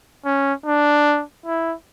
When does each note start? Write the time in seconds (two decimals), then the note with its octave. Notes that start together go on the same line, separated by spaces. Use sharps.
0.25 C#4
0.66 D4
1.46 E4